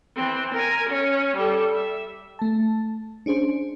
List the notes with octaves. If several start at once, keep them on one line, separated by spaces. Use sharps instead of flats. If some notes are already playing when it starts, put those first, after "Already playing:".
E3 C4
A#4 G#5
C#4
G3 A4
E5
A3 A5
C#4 D4 G#4 C5